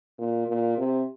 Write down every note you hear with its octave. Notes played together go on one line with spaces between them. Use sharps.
A#2
A#2
C3